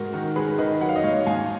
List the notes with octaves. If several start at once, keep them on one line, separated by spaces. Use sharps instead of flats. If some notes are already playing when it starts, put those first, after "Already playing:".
Already playing: G#2 F#4 A#4
D#3 F#4 A#4
G#3 G#4 B4
D#3 B4 D#5
F#3 F#5
F5
D#5
G#2 C#5 F5
G#2 F5 G#5